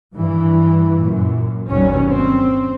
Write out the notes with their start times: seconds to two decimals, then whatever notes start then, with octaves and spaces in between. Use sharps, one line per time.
0.14 G2 E3
0.99 F#2 A#2
1.70 G1 D#2 B2 F#3 G3 C#4
2.11 C4